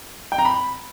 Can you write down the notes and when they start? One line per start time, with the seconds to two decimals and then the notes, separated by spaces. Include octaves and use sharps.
0.32 G5
0.38 A#5
0.45 B5